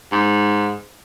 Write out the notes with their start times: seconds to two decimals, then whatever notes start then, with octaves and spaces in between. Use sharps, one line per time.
0.12 G#2